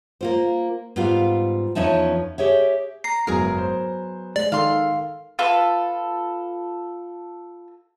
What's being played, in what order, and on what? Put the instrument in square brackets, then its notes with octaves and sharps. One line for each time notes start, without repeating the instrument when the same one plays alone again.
[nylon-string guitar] A#3 F4 C5
G#2 G3 B3 F4 F5
E2 F3 C#4 D#4 E5 A5
G4 G#4 C#5 E5
[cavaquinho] A#5 [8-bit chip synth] C7
[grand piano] F#1 G#2 [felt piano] F#3 B3 [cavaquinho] G#4 A#4
[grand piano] C5
[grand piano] G#3 [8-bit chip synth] D5
[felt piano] D#3 A4 [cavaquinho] F5 C6
[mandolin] F4 A4 B4